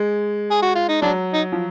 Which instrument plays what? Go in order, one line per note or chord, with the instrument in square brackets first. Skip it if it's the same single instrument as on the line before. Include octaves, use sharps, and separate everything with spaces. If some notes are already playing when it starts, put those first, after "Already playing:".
Already playing: [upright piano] G#3
[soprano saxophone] G#4
F#4
F4
D#4
[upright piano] F#3 [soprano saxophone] D4
[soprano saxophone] D#4
[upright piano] F3